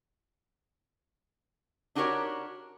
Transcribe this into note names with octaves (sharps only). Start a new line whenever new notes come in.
D4 D#4 F#4 G4 A#4 C#5